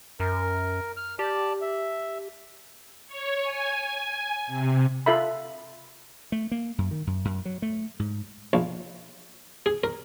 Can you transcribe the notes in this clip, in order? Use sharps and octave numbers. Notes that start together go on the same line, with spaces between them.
F#2 A#4
F6
G4 D5 A5
E5
C#5
G#5
C3
F4 A4 E5 B5
A3
A#3
F#2
D#3
F#2
F#2
F#3
A3
G#2
A#1
G#4
A#4